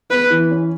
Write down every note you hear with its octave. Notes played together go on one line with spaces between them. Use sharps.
B3 B4
E3
C#4